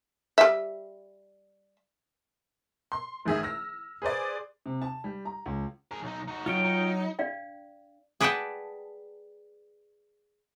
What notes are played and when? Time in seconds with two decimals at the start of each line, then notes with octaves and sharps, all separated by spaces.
0.38 G3 E5
2.92 C6
3.25 A1 D#3 G#4 E5
3.43 E6 F6 A#6
4.02 G#4 B4 C5 D5
4.66 C3
4.82 A5
5.04 G3
5.25 A#5
5.46 C#2
5.91 G#4 A#4
6.03 B1 D#4
6.28 D#4 F#4
6.46 F#3 F4 C#5 G5
6.64 D#4
7.19 D4 D5 F5 G5
8.21 G#4 B4 D5 F#5 G5 A5